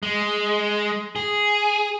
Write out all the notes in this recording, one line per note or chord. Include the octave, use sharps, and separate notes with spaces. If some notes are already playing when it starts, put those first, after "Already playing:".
G#3
G#4